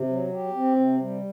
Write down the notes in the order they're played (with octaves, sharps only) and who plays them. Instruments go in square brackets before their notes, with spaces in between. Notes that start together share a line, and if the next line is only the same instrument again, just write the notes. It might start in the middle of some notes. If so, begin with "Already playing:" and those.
Already playing: [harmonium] C3
F#3
G4
C4
C3
G3